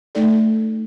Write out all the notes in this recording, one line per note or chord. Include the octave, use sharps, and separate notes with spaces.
A3 D#4 A4 D5